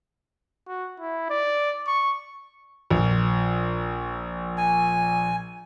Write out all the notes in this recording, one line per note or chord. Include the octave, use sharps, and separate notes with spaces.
F#4
E4
D5
C#6
A#1
G#5